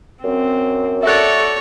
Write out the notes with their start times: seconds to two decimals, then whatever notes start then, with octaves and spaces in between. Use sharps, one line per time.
0.24 F#2 C4
1.03 F#4 A4 C#5 D5 E5 F#6